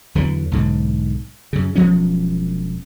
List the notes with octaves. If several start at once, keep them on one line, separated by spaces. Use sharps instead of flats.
E2 D3 E3 F#3
B1 G#2 D3
F#2 C#3
E1 F3 F#3 C#4